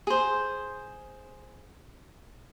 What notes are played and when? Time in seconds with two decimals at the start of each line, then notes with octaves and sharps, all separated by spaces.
0.07 G#4 C5